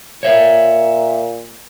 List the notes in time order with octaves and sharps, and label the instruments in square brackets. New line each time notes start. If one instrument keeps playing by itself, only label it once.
[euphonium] A#2 [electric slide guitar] C#5 E5